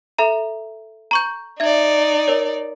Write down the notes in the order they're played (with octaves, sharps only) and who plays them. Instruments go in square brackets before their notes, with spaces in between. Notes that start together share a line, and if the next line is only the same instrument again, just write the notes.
[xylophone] A4 E5 A#5
A#5 C#6 G6
[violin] D#4 D5 [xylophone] E5 G#6
[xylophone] A#4 C#5